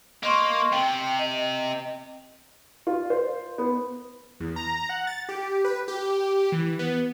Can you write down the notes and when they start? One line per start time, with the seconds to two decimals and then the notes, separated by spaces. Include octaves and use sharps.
0.23 A#3 D#5 C6 C#6
0.72 C3 G5
1.19 D#5
2.87 F4
3.10 C5
3.58 B3
4.40 E2
4.56 A#5
4.89 F#5
5.07 A6
5.29 G4
5.65 B4
5.88 G4
6.52 E3
6.79 B3